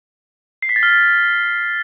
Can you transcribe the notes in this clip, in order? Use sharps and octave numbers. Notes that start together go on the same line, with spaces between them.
C7
B6
A6
F6
A6